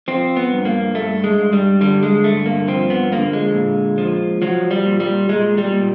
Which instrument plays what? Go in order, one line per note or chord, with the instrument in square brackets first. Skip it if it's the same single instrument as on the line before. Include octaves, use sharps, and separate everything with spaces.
[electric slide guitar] F3 C4
B3
G2
A#3
G2 A3
G#3
G2
G3
D3 G3
G#3
G2 A3
A#3
F3 C4
B3
D3 A#3
G#3
A#2
F3
F3 F#3
G3
A#2
G3
A#2 G#3
G3
A#2